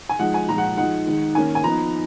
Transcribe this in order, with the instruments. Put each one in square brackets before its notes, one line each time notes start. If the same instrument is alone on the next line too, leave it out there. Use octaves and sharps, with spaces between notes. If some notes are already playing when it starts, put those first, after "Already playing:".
[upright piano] G#5
F3 G#3 D#4 F#5
G#5
A#2 F3 G#3 A#5
F#5
F3 G#3 D#4 F#5
D#3 G#3 D#4
D#3 A#3 C#4 G#5
G#5
F3 B3 D#4 A#5